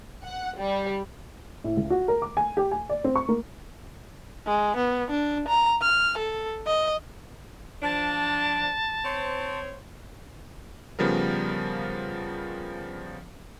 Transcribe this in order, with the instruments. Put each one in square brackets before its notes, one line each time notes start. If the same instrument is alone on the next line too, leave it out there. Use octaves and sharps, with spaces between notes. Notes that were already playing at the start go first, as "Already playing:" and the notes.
[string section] F#5
G3
[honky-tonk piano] A2
C#2
F#4
A#4
D6
G#5
G4
G#5
D5
C4
C#6
A#3
[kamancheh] G#3
B3
D4
A#5
F6
A4
D#5
[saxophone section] F3 D4 [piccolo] A5
[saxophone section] C4 C5 C#5
[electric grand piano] C#3 F3 G3 B3 A#4